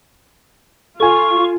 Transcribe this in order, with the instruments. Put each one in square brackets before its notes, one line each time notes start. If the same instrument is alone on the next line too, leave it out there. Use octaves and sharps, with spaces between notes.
[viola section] F4 [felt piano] A4 G#5 [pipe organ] C#6